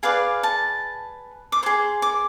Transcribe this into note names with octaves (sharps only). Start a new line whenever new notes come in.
G#4 B4 D5 F5
A5
D6
G#4 C5 C6
D6